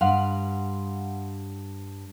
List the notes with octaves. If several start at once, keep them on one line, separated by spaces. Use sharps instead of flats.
G2 F5 F#5 C6